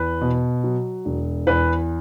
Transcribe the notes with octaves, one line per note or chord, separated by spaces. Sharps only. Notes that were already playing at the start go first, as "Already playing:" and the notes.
Already playing: E2 B4
B2
F#3
E1
E2 B4